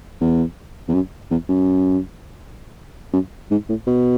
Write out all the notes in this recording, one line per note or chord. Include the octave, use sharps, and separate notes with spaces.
E2
E2
F#2
E2
F#2
F#2
G#2
A2
B2